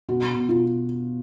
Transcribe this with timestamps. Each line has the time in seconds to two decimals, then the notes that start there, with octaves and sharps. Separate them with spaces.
0.08 B2 F#4
0.35 B2
0.49 F4